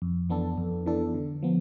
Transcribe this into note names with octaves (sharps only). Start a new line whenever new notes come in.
F2
E3 B3 D4 A4
F2
E3 B3 D4 A4
D3
F3 B3